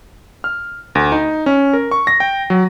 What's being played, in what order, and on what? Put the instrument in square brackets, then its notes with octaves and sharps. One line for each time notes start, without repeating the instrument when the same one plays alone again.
[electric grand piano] F6
D2
D#4
C#4
A#4
C#6
A#6
G5
F#3